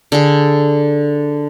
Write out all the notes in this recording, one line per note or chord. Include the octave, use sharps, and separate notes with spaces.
D3 G#4